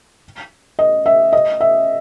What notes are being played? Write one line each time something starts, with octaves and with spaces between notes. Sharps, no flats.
D#5
E5
D#5
E5